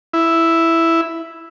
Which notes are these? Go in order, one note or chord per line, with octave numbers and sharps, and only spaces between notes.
E4